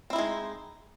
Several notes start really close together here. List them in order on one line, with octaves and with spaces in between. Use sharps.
C4 E4 D#4 G#3